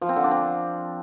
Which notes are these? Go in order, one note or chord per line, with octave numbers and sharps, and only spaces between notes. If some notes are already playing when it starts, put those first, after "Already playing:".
F3
C4
D3
D4
C4